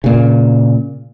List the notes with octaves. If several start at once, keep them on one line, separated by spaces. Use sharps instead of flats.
A#2 C#3